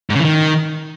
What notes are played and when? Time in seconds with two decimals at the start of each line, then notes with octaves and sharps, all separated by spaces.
0.10 G#2
0.15 C#3
0.20 E3
0.25 D#3